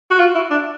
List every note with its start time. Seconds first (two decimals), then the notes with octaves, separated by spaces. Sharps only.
0.11 F#4
0.19 F4
0.35 E4
0.51 D4